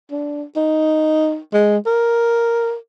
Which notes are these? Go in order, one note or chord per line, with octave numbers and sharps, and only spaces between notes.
D4
D#4
G#3
A#4